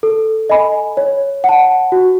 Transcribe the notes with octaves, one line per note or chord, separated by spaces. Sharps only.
A4
D#5 G#5 B5
C#5
F#5 A5
F#4